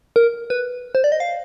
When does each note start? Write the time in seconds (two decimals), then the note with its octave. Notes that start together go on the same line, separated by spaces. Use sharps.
0.16 A#4
0.50 B4
0.95 C5
1.04 D5
1.12 D#5
1.20 F5